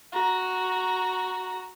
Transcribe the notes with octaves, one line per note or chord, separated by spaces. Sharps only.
F#4 A#5